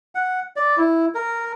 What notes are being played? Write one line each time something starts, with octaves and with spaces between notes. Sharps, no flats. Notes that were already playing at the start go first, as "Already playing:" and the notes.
F#5
D5
E4
A#4